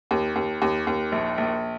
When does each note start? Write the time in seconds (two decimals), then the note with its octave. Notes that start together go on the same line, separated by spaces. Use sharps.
0.11 D#2
0.36 D#2
0.62 D#2
0.87 D#2
1.12 A#1
1.38 A#1